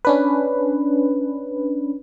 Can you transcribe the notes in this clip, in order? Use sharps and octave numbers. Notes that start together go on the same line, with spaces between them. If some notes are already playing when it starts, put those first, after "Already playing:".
C#4 D4 B4